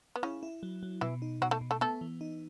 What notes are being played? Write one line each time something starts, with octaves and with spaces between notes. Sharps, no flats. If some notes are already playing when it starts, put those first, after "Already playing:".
B3
C#3 C#4 E4
E4
F#3
F#3
B2 E3 E4
D#4
B2 F#3 F#4
A3 A4
B2
A3 A4
A3 B3 A4
E3
D#4